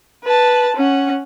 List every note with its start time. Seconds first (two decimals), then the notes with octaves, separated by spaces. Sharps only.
0.24 B4 A5
0.76 C#4 F#5